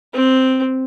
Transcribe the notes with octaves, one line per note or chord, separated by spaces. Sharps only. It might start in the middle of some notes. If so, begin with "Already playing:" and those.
C4